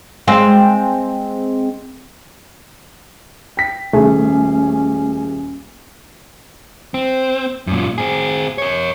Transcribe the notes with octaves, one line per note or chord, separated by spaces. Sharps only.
G#3 C4 F5
G5 B6
D#1 A3 C#4 G#4 G#5
C4
F#2 A#2
C4 G#4
A#4 C#5